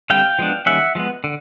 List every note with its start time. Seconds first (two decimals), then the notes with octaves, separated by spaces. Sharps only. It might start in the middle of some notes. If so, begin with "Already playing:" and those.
0.10 D3 G3 C4 F5 G5
0.39 F3 G#3 B3 D4
0.66 D#3 G3 A#3 C#4 E5 F#5
0.95 F3 G#3 B3
1.24 D3